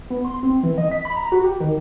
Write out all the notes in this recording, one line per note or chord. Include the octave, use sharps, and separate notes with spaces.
B3
C6
C4
E3
D#5
B6
B5
A#5
F#4
G4
D#3